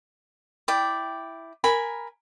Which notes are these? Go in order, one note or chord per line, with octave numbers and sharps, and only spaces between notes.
E4 D5 G5
A#4 G#5 B5